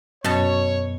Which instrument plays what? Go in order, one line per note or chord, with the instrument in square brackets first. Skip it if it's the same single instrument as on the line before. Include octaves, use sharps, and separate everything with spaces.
[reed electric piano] F#2 [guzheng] B2 A5 [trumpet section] C#5